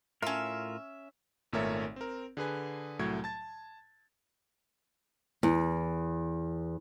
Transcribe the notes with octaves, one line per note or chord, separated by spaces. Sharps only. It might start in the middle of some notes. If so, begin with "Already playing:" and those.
A2 C#4 F4 A#4 E5
G#1 A#2 A3 A#4 C#5 E5
C4 A#4
D3 G#4 B4 G#5
C2 A2 F#3 A3 G#6
A5 A6
E2